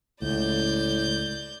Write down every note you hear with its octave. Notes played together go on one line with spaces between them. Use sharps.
C#2 A2 D5 G6